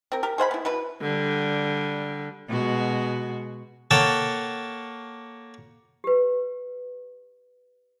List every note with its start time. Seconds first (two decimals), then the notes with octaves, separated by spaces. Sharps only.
0.12 C4 A#4
0.23 G4 A#4
0.38 G#4 C5 F#5 B5
0.51 B3 E4
0.65 B2 E4 B4
1.01 D3 G3
2.48 B2 G#3 F#4
3.91 A#3 A4 C#5 F#5 G5 A5
6.04 G4 B4